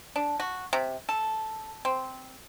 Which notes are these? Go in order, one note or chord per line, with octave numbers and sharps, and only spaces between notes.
D4
F#4
C3
A4
C4